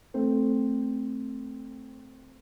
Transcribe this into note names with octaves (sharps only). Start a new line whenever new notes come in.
A3 C4